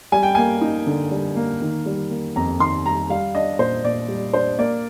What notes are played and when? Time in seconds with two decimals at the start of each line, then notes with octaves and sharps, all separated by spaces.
0.12 G3 G#5
0.23 G5
0.35 A#3 G#5
0.61 D#4
0.87 D3
1.11 G3
1.36 A#3
1.62 D#3
1.86 G3
2.10 A#3
2.36 F2 A#5
2.60 D#3 C6
2.85 G3 A#5
3.10 G3 F5
3.35 D4 D#5
3.59 A#2 C5
3.84 A#2 D5
4.08 G3
4.34 D4 C5
4.58 A#3 D5